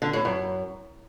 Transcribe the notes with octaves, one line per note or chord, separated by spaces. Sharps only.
D3
A2
F#2